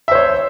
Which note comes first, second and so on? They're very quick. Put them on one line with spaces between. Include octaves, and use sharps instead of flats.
E5 C5 C#5